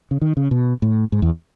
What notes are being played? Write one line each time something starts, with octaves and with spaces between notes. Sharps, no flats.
C#3
D#3
C#3
B2
A2
G#2
E2